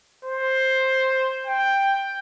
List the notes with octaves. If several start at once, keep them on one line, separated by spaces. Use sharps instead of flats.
C5
G5